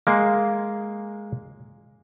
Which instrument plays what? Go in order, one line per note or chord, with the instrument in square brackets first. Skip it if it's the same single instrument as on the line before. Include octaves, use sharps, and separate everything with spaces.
[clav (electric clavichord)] G#3 A#3